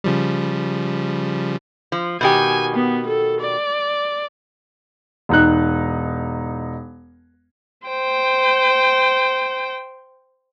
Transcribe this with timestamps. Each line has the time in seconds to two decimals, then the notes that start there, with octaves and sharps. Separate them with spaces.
0.04 C#3 F3 G3
1.92 F3
2.21 B2 D#3 G4 G#5
2.75 B3
3.07 A4
3.40 D5
5.29 E1 D#4 F#6
7.87 C5 G5